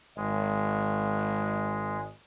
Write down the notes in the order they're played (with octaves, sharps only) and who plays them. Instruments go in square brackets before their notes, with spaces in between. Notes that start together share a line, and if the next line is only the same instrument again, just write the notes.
[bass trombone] G#1 [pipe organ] G#3